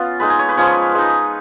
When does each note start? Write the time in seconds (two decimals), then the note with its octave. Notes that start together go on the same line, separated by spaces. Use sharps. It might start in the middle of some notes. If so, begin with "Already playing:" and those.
Already playing: B3 C#4 F4
0.20 G#3 D#4 B4
0.30 G#5
0.39 C#5
0.49 B4
0.57 F3 G#3 C#4 C#5
0.94 G#3 D#4